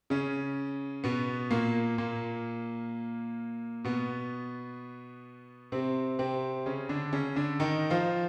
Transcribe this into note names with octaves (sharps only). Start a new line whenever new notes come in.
C#3 C#4
B2 B3
A#2 A#3
A#2 A#3
B2 B3
C3 C4
C3 C4
C#3 C#4
D3 D4
C#3 C#4
D3 D4
D#3 D#4
F3 F4